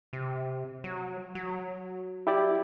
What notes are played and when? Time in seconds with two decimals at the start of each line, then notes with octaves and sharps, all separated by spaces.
0.13 C3
0.84 F#3
1.35 F#3
2.27 E4 G4 D5